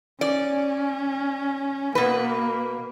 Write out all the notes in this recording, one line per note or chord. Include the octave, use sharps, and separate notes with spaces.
C#4 D5
B2 A#3 B4